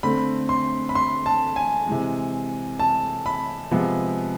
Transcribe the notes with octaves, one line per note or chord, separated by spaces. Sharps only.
D3 A3 C4 B5
C6
B5
C6
A5
G#5
C3 E3 G#3
A5
B5
C3 F3 G#3 B3